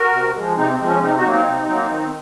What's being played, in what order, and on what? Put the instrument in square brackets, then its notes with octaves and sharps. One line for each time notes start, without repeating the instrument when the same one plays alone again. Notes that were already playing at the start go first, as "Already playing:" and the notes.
Already playing: [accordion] F#4 A#4
C3
F3 G#3
C3 C4 D#4
C4
F3 G#3
C#4
C3 C4 D#4
D#4 F#4
F#3 A#3
C4 D#4
C3
F#3 A#3
D#3